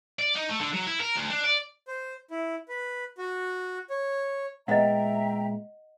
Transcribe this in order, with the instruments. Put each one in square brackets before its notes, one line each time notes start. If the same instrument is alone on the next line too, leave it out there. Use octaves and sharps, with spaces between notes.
[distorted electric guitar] D5
D#4
A3
D3
F#3
E4
A#4
D2
D4
D5
[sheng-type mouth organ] C5
E4
B4
F#4
C#5
[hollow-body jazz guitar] A#2 G#3 B3 [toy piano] D#5 F#5 [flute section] E5 G5 A#5